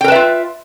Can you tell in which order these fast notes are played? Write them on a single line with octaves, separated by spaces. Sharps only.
G5 A#4 B4 E5 F4